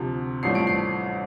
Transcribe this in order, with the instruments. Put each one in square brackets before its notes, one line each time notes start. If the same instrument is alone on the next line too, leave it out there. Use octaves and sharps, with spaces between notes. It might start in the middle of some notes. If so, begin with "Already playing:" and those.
Already playing: [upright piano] D2 C3 F3
A1 G2 F3 A3 C7
D7
C7